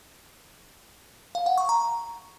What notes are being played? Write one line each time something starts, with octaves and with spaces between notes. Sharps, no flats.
F5
F#5
C#6
A#5